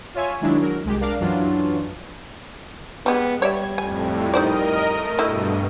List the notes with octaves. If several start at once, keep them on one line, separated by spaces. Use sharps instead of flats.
F4 C#5 E5 G#5
D#3 F#3 G#3 D4 E4
F#3 A#4
C2 G#3 G4
D4 A#4 D5 F5
F#2 E3 F#3 D4 F4
G3 G#3 B3
G3 C#5 D5 E5 G#6
F2 A2 G#5
D#4 A#4 C5 D5 D#5
A3
G2 B2 A3 E4